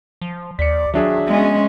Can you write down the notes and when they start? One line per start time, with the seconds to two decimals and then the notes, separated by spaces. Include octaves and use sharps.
0.21 F3
0.59 D#2 D5 B6 C#7
0.94 D#3 F#3 D4 G#4 E5
1.28 G#3 B3 C#4